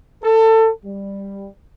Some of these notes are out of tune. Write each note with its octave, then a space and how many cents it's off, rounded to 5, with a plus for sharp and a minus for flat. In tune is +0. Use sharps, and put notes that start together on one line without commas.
A4 +25
G3 +10